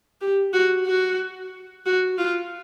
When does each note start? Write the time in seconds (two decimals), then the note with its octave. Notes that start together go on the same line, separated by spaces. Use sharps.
0.21 G4
0.53 F#4
0.86 F#4
1.86 F#4
2.18 F4